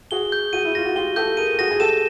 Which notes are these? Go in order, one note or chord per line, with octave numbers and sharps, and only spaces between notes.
F#4 G#4 G7
G6
F#4 G#4 D#7
E4
F4 A#6
F#4
F4 G4 G7
G4 A4 G6
G#4 A#4 D#7
F#4 G#4 A#6
G#4
G4 A4 E7